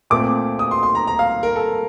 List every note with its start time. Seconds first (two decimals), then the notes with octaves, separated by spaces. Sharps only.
0.10 A#2 A3 C4 D6
0.59 D#6
0.71 C6
0.83 C6
0.95 A#5
1.07 A#5
1.19 F5
1.43 A#4
1.56 A4